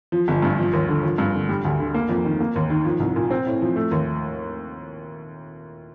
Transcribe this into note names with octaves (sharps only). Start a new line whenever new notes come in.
F3
G1
G2
F3
D#2
D3
F3
G2
D3
G3
D2
D3
A#3
F2
D#3
A#3
D#2
D#3
F3
C2
A#2
C4
A2
F3
A3
D#2